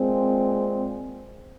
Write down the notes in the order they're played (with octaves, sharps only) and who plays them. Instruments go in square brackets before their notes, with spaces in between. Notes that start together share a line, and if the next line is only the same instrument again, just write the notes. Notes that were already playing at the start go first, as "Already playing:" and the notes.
Already playing: [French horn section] A#2 G#3 C4